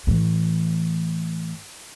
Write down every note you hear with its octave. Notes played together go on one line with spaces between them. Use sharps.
A2 E3